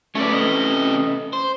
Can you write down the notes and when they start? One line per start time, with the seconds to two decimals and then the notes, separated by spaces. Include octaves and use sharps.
0.15 A3 C#4 A4 B4 D5
0.33 C3 D#5
1.33 C5